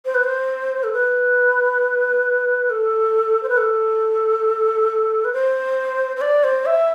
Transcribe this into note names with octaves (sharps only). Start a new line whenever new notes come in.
C5
B4
C5
A4
B4
A4
C5
B4
A4
B4
C5
C5
D5
C5
E5